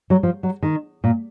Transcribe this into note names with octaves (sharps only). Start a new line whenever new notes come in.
F#3
F3
F#3
D#3
A#2